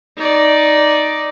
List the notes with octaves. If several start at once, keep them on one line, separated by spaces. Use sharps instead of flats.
D#4 D5